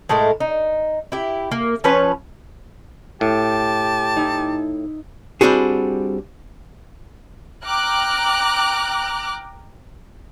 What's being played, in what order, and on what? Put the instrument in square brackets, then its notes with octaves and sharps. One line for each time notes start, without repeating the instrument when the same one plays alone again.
[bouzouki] A2 G#3 A3 A#4
D#4
E4 G4
A#3
F3 C#4 B4 C#5
[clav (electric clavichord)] A2 [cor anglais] G4 [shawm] A5
[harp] D#4 E4
[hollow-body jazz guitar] G3 C4 D4 E4 F#4 G#4
[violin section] G5 A#5 D6 F6 F#6